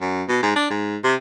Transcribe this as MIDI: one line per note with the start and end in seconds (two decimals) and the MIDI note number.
0.01 0.23 42
0.29 0.43 47
0.43 0.55 44
0.56 0.69 62
0.70 0.97 44
1.04 1.15 48